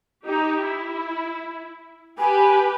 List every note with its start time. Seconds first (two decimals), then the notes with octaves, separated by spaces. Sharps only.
0.25 D#4 G4
0.63 E4
2.18 G4 B4 G#5